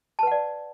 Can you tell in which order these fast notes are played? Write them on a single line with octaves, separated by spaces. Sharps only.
A5 B4 F#5 D5